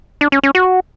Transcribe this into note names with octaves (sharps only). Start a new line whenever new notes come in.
D4
C#4
C#4
F#4